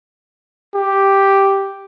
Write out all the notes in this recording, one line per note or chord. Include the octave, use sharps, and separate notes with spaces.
G4